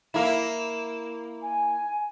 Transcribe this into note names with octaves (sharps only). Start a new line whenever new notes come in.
A#3 E4 E7
G#5